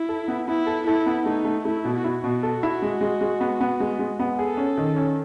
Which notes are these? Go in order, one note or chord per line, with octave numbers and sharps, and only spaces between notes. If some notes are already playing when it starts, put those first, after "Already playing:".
Already playing: E4
A4
B3
B3 E4
A4
E4 A4
B3
A3 D#4
A3
A3 E4
B2
E4 F#4
B2
A4
E4
G#3
G#3
G#3
B3
B3
G#3
G#3
B3
G#4 A4
C#4
D#3
C#4